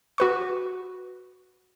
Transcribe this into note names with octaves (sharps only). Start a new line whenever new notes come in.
F#4 B4 C#6